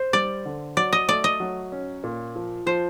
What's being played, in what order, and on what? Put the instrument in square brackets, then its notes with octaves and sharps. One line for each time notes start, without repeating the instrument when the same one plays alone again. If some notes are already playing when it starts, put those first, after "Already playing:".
Already playing: [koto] C5
[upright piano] G3 [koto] D5
[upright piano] D3
[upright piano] F#3 [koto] D5
[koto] D#5
[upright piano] A3 [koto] D5
[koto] D#5
[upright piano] F#3
C#4
A#2
F3
[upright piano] F3 [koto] C5